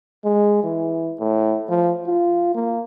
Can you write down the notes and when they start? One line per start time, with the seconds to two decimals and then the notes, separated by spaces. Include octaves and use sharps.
0.24 G#3
0.63 E3
1.19 A2
1.69 F3
2.06 F4
2.55 A#3